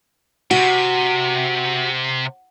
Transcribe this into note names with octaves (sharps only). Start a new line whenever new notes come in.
C3 F#4